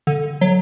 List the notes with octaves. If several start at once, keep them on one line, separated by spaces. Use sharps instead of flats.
D3
F#3